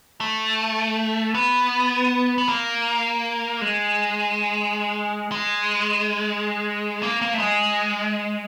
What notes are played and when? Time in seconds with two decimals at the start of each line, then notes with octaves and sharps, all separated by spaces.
0.21 A3
1.35 B3
2.38 B3
2.49 A#3
3.61 G#3
5.32 G#3
7.03 A#3
7.22 A#3
7.34 A3
7.40 G#3